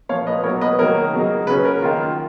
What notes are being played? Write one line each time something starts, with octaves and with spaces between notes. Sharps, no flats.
A#2 F3 A#3 C#5 F5
B4 D#5
B2 F#3 A#3 A#4 C#5
B4 D#5
D#3 F#3 A#3 D#4 A#4 C#5
C#3 F#3 A#3 D#4
C#3 F#3 C#4 B4
A#4
D#3 A#3 F4